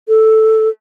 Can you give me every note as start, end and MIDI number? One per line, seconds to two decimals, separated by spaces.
0.08 0.69 69